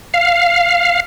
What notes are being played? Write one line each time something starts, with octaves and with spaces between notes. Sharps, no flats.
F5